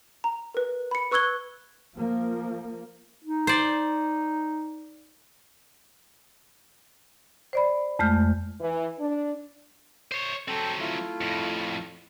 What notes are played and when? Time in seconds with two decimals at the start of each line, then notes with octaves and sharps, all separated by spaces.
0.24 A#5
0.54 A#4 B4
0.91 B5 C#7
1.12 B4 C#6 E6 F#6 G#6 G7
1.96 F3 A#3
3.24 D#4
3.47 C5 D5
7.53 C5 D5 B5
7.99 F2 G#3 A3 F6 G6
8.61 E3
8.99 D4
10.12 C5 C#5
10.48 F#3 C4 A4 G5
10.80 A3 E4 F4
11.21 F2 A2